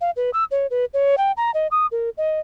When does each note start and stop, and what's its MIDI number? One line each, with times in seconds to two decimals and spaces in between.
0.01 0.11 77
0.16 0.30 71
0.33 0.44 88
0.51 0.67 73
0.71 0.85 71
0.94 1.15 73
1.18 1.32 79
1.37 1.51 82
1.54 1.67 75
1.71 1.87 87
1.91 2.10 70
2.18 2.40 75